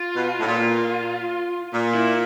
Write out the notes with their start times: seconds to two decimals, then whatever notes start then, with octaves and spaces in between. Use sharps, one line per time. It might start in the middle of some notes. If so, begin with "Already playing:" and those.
Already playing: F4
0.15 B2
0.39 A2
0.47 A#2 F4
1.73 A#2
1.94 E4